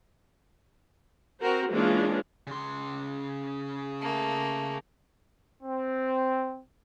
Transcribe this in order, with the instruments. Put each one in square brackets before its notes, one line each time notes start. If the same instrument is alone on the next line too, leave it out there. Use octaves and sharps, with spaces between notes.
[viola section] C4 F#4 A#4 C5
E3 G#3 A#3 C#4 D4 F4
[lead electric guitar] C#3 C6
[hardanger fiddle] A3 A#3
[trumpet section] C4